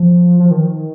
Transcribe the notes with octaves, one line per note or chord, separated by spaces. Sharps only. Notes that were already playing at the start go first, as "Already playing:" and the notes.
Already playing: F3
F3
D#3